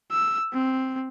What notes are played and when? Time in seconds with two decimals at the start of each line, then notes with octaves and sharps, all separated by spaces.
0.12 E6
0.54 C4